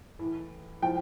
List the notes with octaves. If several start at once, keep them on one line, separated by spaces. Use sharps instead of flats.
A2 E3
A2 F3 G5